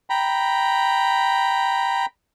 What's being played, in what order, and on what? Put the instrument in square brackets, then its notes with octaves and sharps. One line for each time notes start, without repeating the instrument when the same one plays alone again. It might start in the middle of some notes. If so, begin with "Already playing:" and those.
[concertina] G5 A#5 B5